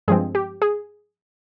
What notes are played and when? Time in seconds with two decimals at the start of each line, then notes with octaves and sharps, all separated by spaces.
0.08 G2 F3 G#3 C4 G#4
0.35 G4
0.62 G#4